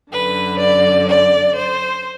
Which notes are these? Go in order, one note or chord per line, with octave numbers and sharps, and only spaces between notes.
F#2 D3 B4
D5
D5
C5